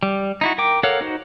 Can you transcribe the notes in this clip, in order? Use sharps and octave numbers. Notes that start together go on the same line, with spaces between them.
G3
D#4 E4 F#4
A#4 G5 D6
A4 A#4 C#5 F5 F#5
D#4 F#4 C5